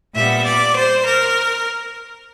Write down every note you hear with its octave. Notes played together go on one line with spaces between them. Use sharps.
A#2 G3 B3 E5
D5
C5
A#4